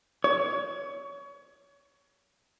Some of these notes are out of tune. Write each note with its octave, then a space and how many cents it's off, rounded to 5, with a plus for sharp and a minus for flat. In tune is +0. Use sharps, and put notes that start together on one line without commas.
C#5 +25